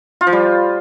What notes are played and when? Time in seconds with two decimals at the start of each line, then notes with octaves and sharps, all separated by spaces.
0.21 F4
0.27 F3
0.33 G3